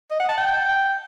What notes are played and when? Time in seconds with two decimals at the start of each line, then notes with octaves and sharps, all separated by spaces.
0.11 D#5
0.20 F#5
0.28 A5
0.37 G5